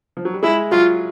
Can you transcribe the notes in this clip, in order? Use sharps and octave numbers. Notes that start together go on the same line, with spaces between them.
F3
F#3
G3
G#3 E4
F#3 F4